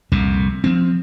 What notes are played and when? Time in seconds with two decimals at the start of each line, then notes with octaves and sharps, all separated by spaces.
0.12 C2 F2 A#2
0.64 F3 C4